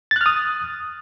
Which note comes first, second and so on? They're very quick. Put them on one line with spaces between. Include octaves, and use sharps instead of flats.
A6 F#6 F6 D#6